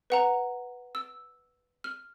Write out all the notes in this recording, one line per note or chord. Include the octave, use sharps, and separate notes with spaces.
B4 F#5 A#5
E6
F6